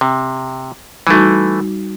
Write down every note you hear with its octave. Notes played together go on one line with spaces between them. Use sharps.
C3
E3 G3 A3 D#4 F#4